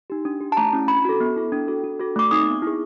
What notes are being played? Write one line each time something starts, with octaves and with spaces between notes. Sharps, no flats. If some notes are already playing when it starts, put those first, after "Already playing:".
D#4 G4
D4
G4
A5
A3 A#5
C#4 E4
D4 B5
F#4 A4
B3
E4 A4
D4
F#4 A4
D4
F#4 A4
A3 D6
C4 D#4 D#6
B3
E4 G#4